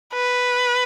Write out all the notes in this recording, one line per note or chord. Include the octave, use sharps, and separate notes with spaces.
B4